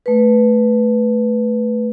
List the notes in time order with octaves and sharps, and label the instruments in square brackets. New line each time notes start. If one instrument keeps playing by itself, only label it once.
[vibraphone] A3 B4